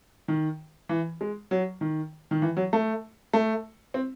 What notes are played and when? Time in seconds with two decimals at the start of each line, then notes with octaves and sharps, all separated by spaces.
0.28 D#3
0.89 E3
1.21 G#3
1.51 F#3
1.81 D#3
2.31 D#3
2.42 E3
2.57 F#3
2.73 A3
3.33 A3
3.94 C4